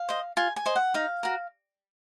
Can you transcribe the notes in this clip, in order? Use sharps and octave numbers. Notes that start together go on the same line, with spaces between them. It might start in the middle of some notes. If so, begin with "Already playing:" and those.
Already playing: F5
C5 D#5
F4 G#5
G#5
C5 D#5
F#5
D#4 F5
F#4 A#4